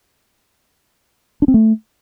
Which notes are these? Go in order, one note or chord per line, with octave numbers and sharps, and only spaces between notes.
D4
C4
A3